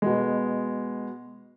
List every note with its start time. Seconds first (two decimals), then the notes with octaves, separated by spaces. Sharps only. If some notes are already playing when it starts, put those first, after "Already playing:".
0.02 B2 G#3